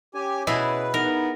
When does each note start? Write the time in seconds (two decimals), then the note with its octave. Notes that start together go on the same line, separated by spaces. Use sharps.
0.15 C#4 G4 G#5
0.47 B2 E4 G#4 B4 B5
0.94 B3 D#4 A#4